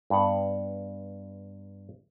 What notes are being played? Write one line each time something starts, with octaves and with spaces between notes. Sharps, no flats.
G2 B3 F#5